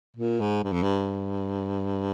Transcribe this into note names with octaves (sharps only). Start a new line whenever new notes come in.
A#2
G#2
G2
F2
G2